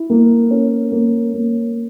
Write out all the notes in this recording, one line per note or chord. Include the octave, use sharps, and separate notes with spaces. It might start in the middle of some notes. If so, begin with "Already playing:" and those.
Already playing: E4
A#3
C#4
A#3
A#3